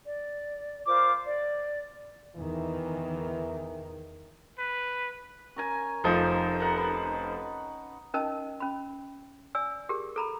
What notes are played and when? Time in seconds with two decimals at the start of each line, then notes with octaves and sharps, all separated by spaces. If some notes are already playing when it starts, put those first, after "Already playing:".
0.06 D5
0.86 F4 A#4 C5 D6
1.26 D5
2.36 E2 D#3 E3
4.58 B4
5.56 C#4 A#4 G#5
6.04 F1 F3 D#4
6.60 A#4 F#5
6.77 B4
8.14 C#4 D#4 A#4 D#5 A5
8.60 C#4 B5
9.55 D5 G#5 E6
9.89 G4 G#4 A#4
10.16 A4 A#5 B5